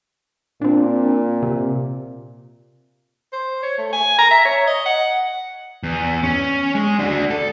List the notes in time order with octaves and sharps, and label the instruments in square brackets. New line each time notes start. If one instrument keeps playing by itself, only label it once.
[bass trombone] A#2 [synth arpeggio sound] C4 D4
[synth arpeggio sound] C3
[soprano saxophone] C5
C#5
A3
G#5
A#5
E5
C#5
D#5
F#5
[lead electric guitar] E2
C#4
G#3
D4 F#4
A4